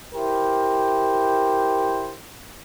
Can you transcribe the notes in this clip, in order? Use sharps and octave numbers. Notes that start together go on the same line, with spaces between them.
E4 G4 A#4 C5